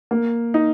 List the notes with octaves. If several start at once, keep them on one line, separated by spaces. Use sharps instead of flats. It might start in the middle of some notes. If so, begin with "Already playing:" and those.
A#3
D#4